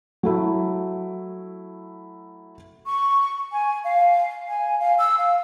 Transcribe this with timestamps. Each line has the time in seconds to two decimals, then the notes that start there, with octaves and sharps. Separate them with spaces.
0.23 F#3 A3 E4
2.86 C#6
3.52 G#5
3.84 F5
4.48 G#5
4.80 F5
4.99 E6
5.18 F5